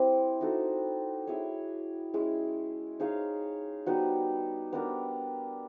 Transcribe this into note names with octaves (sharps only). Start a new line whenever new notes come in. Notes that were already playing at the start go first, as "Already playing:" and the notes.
Already playing: C4 E4 G4
D#4 F#4 A4
E4 G#4 C#5
G#3 C#4 E4 G#4
D#4 G#4 C#5 F5
G3 B3 D#4 F#4
B3 D4 G4 A#4